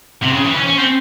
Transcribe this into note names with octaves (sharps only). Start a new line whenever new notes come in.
C3
C#3
E3
C#4
C#4
C4